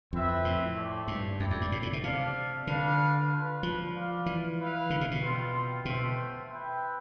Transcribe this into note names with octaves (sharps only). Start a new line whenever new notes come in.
F2 C4 E4 B4 E5
A2
A3 C4 E4 A4 D5
G2
F2 E4 G4 D5
F2
G2
A2
A2
B2
C3 D4 A4 D5 F5
D3 D4 F4 B4 D5 F5
D4 F4 B4
F3
F4 B4 D5 F5
E3
E4 B4 F5
D3
C3
B2
G3 C4 F4
B2 A3 C4 F4 C5 E5
E4 B4 E5 G5